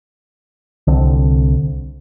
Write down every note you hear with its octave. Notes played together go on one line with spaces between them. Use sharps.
C2 D3 C4